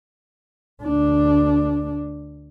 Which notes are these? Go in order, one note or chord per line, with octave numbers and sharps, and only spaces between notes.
D2 D4